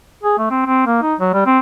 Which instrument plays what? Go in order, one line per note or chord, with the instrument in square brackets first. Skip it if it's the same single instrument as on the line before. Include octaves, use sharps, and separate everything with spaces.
[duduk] G#4
A3
C4
C4
A#3
D#4
F#3
G3
C4